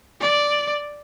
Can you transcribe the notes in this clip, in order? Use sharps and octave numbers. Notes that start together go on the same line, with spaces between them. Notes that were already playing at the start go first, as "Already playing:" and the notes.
D5